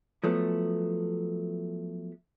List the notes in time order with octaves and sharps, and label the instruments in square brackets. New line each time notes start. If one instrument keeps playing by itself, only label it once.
[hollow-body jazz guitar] F3 F#3 A3 B3